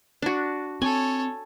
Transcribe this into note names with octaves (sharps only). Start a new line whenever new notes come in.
D4 F#4
C4 A4 C#5 G#5